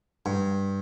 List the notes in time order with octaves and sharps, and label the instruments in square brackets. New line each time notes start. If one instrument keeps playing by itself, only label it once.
[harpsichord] G2